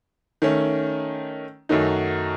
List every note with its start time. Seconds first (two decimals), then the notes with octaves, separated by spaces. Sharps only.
0.42 D#3 A3 C#4
1.69 F#2 D#3 F#3 A3 D#4